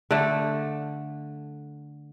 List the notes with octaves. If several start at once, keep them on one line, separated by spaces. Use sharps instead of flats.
D3 A3